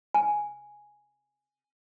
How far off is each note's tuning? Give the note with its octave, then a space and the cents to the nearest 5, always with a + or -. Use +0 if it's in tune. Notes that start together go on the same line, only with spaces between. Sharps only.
G#5 +0